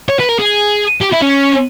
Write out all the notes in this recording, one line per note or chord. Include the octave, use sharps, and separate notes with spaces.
C#5
B4
A#4
G#4
G4
E4
C#4